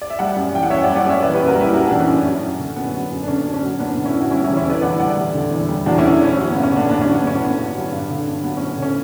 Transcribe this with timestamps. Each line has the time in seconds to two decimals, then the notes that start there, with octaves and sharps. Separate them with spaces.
0.02 D5
0.10 E5
0.19 G3 D5 F#5
0.36 F#2
0.53 E3 G5
0.63 F#5
0.70 F#2 C#5 E5
0.84 D5 F#5
0.88 G3
0.96 D5 F#5
1.05 F#2 C#5 E5
1.22 E3 B4 D5
1.35 G4 B4
1.40 F#2
1.48 F#4 A#4
1.56 G3 E4 G4
1.73 F#2 F#4 A#4
1.87 E3 D4 F#4
2.00 C#4
2.08 F#2
2.25 F#3
2.43 F#2
2.59 D3
2.76 F#2 B3
2.94 F#3
3.11 F#2
3.23 D4
3.28 D3 C#4
3.46 F#2 D4
3.54 C#4
3.63 F#3
3.79 F#2 B3 D4
3.97 D3
4.05 C#4 E4
4.15 F#2
4.21 F#4
4.31 G3 C#4 E4
4.44 C#4 E4
4.49 E2
4.57 C#4 E4
4.66 D3 B4 D5
4.82 E2 D5 F#5
5.00 G3 D5 F#5
5.17 E2
5.34 D3
5.51 E2
5.69 G3
5.86 E2 D4 F#4
5.98 C#4 E4
6.04 D3
6.21 E2 C#4
6.37 F#3 C#4
6.50 B3
6.55 G2
6.63 C#4
6.72 D3 B3 D4
6.89 G2 B3 D4
7.01 C#4
7.06 F#3
7.14 B3 D4
7.23 G2 C#4
7.40 D3 B3
7.58 G2
7.75 F#3
7.91 G2
8.10 D3
8.27 G2
8.43 F#3 B3
8.57 F#2 C#4
8.78 D3 C#4